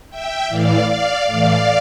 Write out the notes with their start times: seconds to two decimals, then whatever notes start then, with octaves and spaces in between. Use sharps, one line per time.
0.10 E5 G5
0.48 A2 E3 D5 F5
0.87 D5 F5
1.27 A2 E3 D5 F5